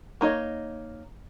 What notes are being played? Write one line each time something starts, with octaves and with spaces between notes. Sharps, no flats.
A#3 D#4 C#5 D#5